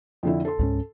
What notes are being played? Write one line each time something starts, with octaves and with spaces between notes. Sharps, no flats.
F2 D3 E4
A4 C6
C#2 G#2 C#4